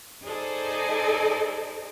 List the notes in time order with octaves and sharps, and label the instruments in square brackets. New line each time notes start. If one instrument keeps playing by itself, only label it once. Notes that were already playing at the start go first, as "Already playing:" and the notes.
[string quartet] D#4 G#4 A4 C5 D5